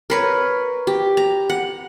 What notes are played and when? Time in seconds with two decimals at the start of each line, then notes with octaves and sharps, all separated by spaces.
0.10 A#4 B4 C#5
0.87 G4
1.17 A#5
1.50 F#5